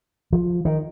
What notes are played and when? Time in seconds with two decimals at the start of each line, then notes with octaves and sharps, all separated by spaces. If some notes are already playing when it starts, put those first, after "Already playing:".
0.33 F3
0.65 D#3